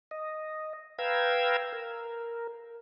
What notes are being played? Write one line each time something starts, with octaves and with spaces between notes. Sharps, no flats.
D#5
B4 F5 G5 A#5 E6 G#6
A#4